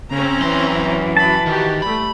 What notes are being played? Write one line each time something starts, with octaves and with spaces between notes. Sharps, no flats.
C#3 C4 C#4 A#5
F#2 E3 C6
F#3 A5 B5
D#3 F#4 G4
G3 A3 B5